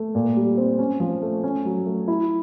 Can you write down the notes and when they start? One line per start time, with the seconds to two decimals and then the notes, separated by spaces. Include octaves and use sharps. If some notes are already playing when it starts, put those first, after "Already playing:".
Already playing: A3
0.15 A#2
0.36 G3
0.57 C4
0.79 C#4
1.00 F3
1.22 A3
1.44 C#4
1.65 F#3
1.86 A3
2.08 E4